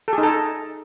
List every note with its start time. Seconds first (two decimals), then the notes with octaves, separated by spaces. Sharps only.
0.08 A4
0.13 G#4
0.18 D#4
0.23 A4